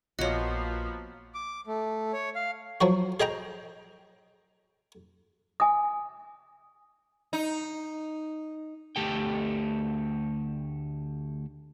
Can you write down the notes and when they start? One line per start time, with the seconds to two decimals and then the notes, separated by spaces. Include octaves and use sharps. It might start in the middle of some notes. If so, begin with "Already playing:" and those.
0.19 A#1 F3 A#3 B3 F4 F#4 C#5 D#5
1.34 D6
1.67 A3
2.13 C#5
2.35 F5
2.81 F3 F#3 F#4
3.20 G#4 D#5 G5 A#5
5.60 G#5 D#6
7.33 D#4
8.96 D2 A3 G4 A4 G5